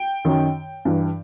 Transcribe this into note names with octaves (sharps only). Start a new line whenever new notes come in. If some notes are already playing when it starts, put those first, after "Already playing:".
Already playing: G5
F#2 D#3
G2 E3